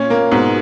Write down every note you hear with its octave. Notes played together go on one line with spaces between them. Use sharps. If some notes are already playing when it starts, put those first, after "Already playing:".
Already playing: A#2 C#4
A#3
G#2 B2